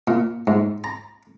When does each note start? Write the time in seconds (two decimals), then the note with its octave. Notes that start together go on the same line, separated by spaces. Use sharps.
0.07 A#2
0.47 G#2
0.84 A#5